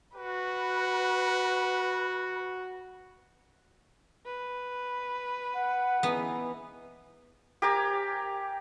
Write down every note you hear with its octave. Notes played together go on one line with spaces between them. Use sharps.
F#4 B4
B4
F#5
E3 B3 D#4
G4 A#4 G#5 D6